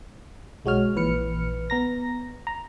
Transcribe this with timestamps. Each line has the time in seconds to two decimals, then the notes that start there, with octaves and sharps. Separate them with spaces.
0.65 B1 G#3 F#4 C#5 F6
0.95 A#1 A#2 E3 B4 F6 C#7
1.70 B3 A#5 A#6
2.47 A#5